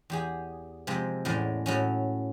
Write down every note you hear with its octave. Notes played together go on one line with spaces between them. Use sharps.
E2 G4 G#4
C3 F3 G#3 C4
E2 A2 G#3 C#4 D5
A2 F#3 C#4